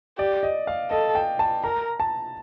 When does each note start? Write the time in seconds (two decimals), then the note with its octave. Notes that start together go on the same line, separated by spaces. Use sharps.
0.18 G4 D5
0.43 D#5
0.67 F5
0.91 A4 D#5
1.15 G5
1.39 A5
1.64 A#4 A#5
2.00 A5